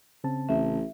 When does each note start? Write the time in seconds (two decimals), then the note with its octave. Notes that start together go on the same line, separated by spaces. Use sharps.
0.24 C#3 C4 A5
0.49 A1 E5